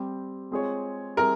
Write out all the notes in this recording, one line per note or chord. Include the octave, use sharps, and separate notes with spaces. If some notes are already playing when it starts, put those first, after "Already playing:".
Already playing: G3 C4 G4
G#3 C4 F4 G#4 C#5
G3 C4 E4 G#4 A#4